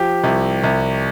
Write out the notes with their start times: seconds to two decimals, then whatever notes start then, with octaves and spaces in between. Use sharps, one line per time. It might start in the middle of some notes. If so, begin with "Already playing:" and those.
Already playing: F3 G4
0.24 C2
0.64 C2